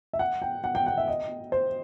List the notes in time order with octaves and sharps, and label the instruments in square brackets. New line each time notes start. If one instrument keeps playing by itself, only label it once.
[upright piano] E5
F#5
G5
F#5
G5
F#5
E5
D#5
C5